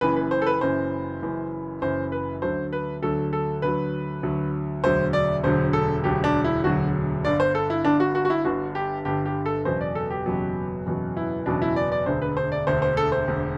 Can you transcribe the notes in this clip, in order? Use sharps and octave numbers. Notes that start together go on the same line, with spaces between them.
F#1 F#2 E3 B4
B4
C5
A4
B4
F#1 F#2 E3 C5
F#1 F#2 E3
F#1 F#2 E3 C5
B4
D2 D3 F#3 C5
B4
D2 D3 F#3 A4
A4
D2 D3 F#3 B4
D2 D3 F#3
E1 D2 D3 F#3 C5
D5
E1 D2 D3 F#3 C5
A4
E1 D2 D3 F#3 G4
D4
E4
E1 D2 D3 F#3 F#4
G1 G2 D3 D5
C5
A4
E4
G1 G2 D3 D4
F#4
F#4
F#4
E4
G1 G2 D3 F#4
G4
G1 G2 D3 G4
G4
A4
F#1 E2 B2 F#3 C5
D5
A4
G4
F#1 E2 B2 F#3
F#1 E2 B2 F#3
E4
F#1 E2 B2 F#3 D4
E4
D5
D5
E1 D2 D3 C5
B4
C5
D5
E1 D2 D3 C5
C5
A4
C5
E1 D2 D3